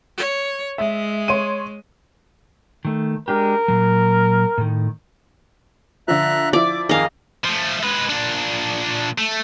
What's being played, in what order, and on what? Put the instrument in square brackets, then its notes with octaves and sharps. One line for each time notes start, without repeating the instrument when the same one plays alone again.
[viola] C#5
[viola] G#3 [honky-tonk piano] E5
[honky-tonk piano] C#5 C6 D#7
[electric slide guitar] D#3 A3
[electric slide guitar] G#3 D4 G4 [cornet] A#4
[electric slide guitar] A#2 F#3
A2 D#3
[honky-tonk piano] D3 F3 [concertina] E5 A#5 F#6
[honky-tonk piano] F3 E4 [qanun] D5 [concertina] D6
[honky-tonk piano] F2 D#3 [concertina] G#4 A#4 [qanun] D#5 F5
[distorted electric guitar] F3 A3
G#3 B4
A#2 D4
A3